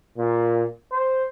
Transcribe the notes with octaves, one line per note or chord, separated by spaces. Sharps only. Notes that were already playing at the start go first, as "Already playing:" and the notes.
A#2
C5